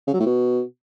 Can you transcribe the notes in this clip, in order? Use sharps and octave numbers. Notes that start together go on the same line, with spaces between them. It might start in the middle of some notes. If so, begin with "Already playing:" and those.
C#3
F#3
A2
B2